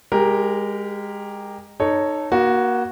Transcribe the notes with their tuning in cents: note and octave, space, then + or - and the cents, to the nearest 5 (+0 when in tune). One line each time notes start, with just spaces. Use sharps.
G#3 -25 G4 +0 A#4 +0
D#4 -15 A4 +0 C#5 +0
A#3 +30 F#4 +0